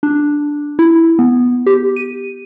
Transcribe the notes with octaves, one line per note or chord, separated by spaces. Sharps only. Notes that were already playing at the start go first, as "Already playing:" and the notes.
D4
E4
B3
G4
D#7